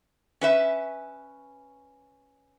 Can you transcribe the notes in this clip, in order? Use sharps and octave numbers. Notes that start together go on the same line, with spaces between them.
C#4 B4 E5